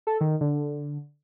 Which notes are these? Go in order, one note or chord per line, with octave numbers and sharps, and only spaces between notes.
A4
D#3
D3